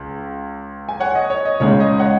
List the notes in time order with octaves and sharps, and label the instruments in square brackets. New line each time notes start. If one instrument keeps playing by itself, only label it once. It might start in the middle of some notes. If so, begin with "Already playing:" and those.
Already playing: [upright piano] C#2
G#5
C#5 F#5
D#5
C#5
D#5
C#2 C#3 G#3 D#4 C#5
D#5
C#5 F#5